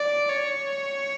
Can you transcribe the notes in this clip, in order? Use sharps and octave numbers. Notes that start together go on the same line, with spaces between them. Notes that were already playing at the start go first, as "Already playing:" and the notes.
Already playing: D5
C#5